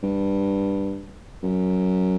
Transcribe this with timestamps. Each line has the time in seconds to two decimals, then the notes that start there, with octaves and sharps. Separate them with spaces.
0.03 G2
1.43 F#2